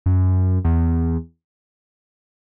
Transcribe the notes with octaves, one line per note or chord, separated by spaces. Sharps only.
F#2
E2